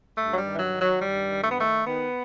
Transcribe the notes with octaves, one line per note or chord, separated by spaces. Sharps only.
G2 A3
F#3
G3
D#3
E3
F#3
D#3
F#3
G2 G3
D#3
A3
B3
D#3 A3
D#3 B3